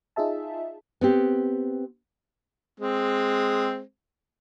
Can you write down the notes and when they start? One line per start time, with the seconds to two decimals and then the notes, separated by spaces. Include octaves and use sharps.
0.16 D#4 F4 G#4 E5 A5
1.01 B3 C4 G4
2.80 G#3 C4